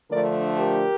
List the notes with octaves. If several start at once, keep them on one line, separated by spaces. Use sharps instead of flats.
D3 F3 A3 D4 A#4 D5
G4 A#4